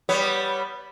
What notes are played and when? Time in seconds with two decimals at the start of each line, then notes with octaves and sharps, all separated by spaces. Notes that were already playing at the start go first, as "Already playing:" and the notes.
0.09 G3 B3 C#5